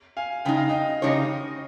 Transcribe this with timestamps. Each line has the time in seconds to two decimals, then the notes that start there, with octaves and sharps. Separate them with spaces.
0.17 F5 G#5
0.45 C#3 G#3 D#4 G5
0.57 F5
0.69 D#5 G5
1.02 C#3 G#3 D#4 G4 C#5